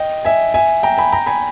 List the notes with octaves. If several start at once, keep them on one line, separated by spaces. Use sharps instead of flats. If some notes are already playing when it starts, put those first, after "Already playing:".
Already playing: D#5 G5
E5 G#5
E5 G#5
G5 A#5
G#5 B5
G5 A#5
G#5 B5